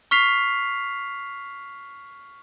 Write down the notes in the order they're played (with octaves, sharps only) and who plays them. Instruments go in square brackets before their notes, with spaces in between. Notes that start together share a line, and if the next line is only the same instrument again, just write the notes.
[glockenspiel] C#6 F6 B6 C7 F7